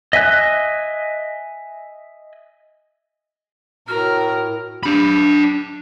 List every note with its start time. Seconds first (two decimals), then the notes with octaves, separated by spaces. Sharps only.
0.13 D#5 E5 G#5 F#6
3.88 A2 F#4 A#4 F6
4.83 D4 B5